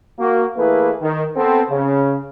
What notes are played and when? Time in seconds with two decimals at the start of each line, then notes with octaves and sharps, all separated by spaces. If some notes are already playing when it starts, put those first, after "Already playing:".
0.19 A#3 F#4
0.57 E3 A3 A#3 E4 G#4 B4
1.02 D#3
1.36 B3 C4 A4
1.70 C#3